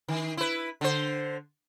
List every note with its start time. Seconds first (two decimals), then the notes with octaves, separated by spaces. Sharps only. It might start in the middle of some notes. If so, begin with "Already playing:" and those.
0.08 D#3
0.37 E4 B4
0.81 D3 C5